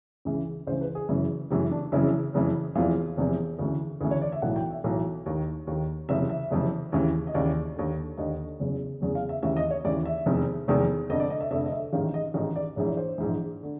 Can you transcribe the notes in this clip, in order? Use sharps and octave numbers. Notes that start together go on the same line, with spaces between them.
C#2 C#3 E3
C#2 C#3 E3 C5
B4
G#4
F#1 F#2 C#3 E3
F#1 F#2 C#3 E3 G4
D4
F#1 F2 C#3 E3 E4
F#1 F2 C#3 E3
F1 E2 C3 E3 F4
F1 E2 C3 E3
D2 C#3 E3
D2 C#3 E3 G#4
C#5
D5
E5
B1 A2 E3 F#5
G5
E5
B1 A2 E3
D#2 D#3
D#2 D#3
F#1 F2 C3 E3 E5
E5
F#1 F2 C3 E3
D#2 C#3 E3
D#5
D#2 C#3 E3 D5
D#2 D3
D#2 D3 D#5
F#1 E2 C#3
F#1 E2 C#3
F5
E5
D#2 C#3 E3 E5
D#5
C#5
D#2 C#3 E3 D5
E5
F1 E2 C3 D#3
F1 E2 C3 D#3
F1 F2 D3 D#5
D5
D#5
E5
F1 F2 D3 E5
D#5
E5
A1 G#2 D#3 F5
D#5
A1 G#2 D#3 D#5
D5
A#1 G#2 E3 C#5
C#5
C5
A#1 G#2 E3
D3